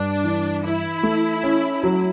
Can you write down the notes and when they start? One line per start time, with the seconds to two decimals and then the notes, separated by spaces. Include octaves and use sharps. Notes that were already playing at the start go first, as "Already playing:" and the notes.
Already playing: G2 D4
0.24 E3
0.63 E3 E4
1.03 A3
1.44 C#4
1.83 F#3